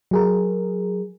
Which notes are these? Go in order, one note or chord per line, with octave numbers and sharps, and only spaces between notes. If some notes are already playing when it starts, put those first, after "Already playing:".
F#3 G#4 A#4